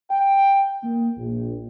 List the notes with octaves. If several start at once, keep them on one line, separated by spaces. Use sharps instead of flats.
G5
A#3
A#1